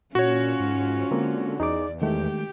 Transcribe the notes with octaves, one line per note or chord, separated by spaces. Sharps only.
A#2 C#4 F4 F#4 C#5
G#2
D3 G#3 A#3 C4
E2 D#4 G#4 D5 D6
D#3 G#3 A3 G4 G5